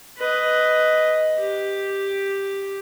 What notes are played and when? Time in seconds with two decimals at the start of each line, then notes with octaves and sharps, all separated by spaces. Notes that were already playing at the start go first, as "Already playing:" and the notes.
0.17 B4 D#5
1.40 G4